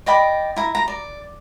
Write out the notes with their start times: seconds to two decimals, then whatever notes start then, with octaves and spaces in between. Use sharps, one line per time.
0.06 D5 D#5 G5 B5
0.56 E4 A#5
0.75 A#5
0.88 D5